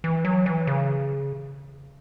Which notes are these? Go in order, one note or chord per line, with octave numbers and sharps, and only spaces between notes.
E3
F#3
E3
C#3